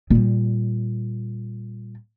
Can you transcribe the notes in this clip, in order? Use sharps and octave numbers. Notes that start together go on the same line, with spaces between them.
A#2 G3